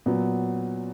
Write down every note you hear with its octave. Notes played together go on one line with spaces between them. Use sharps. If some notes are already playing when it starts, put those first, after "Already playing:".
A#2 F#3 B3